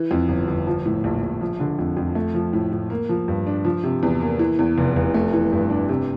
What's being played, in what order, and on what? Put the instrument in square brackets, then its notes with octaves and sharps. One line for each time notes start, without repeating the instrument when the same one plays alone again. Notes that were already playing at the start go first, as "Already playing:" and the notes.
Already playing: [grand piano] E3
F2
G1
G1
F3
A2
A#1
A#1
F3
D3
F2
F2
A3
F3
A2
A2
A#3
F3
G2
D4
F3
C3
E2
A#3
E3
E2
F1
F1
A3
E3
G2
D4
C3